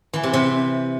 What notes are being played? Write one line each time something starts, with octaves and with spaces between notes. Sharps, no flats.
E3
C3
C3